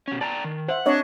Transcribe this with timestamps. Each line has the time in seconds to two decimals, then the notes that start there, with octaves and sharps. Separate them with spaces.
0.08 B2 C#4
0.21 D5 G5 A5 A#5
0.44 D#3
0.69 C5 E5 F#5
0.86 C4 D4 C#5 D#5